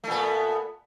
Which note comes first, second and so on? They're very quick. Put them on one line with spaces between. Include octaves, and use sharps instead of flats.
A3 A#2 B3